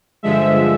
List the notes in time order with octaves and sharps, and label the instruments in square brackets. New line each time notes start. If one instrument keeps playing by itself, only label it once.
[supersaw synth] G2 D3 F3 G#3 E5